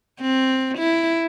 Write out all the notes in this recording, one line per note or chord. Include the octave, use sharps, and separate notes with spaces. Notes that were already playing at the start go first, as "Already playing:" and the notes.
C4
E4